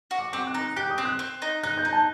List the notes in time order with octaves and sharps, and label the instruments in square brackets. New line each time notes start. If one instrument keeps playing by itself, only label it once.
[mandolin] F#4
[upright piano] D6
[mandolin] C4 [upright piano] D6
[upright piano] F#6
[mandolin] D#4
[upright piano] F#6
[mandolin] G4 [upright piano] F#6
[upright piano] D#6
[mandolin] C4
[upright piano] F#6
[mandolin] C4
D#4
[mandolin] D#4 [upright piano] F#6
[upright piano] G6
[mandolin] D#4
[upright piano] A5